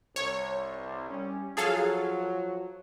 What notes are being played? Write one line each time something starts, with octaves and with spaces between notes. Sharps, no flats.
C2 C#5
G3 C#4
F3 F#3 G#4 A4 F5